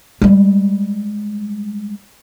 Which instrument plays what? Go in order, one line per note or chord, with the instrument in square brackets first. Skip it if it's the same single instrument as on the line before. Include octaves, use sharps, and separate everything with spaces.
[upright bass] G3 G#3